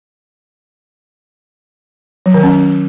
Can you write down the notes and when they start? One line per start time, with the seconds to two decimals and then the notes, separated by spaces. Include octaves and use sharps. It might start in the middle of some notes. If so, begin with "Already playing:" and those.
2.26 F#3
2.34 D#3
2.43 C#4